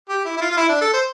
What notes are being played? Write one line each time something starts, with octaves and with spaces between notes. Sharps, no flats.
G4
E4
E4
F4
F4
E4
D4
A4
C5